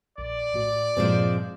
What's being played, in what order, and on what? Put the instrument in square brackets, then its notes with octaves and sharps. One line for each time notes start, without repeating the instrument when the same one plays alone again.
[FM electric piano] A#1 [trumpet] D5
[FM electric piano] A2 A3 F#4
[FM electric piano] G2 A#2 G6 [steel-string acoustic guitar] F3 G#3 C4